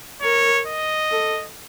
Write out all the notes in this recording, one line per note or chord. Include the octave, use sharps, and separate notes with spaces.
A#4 C#5
D#5
A4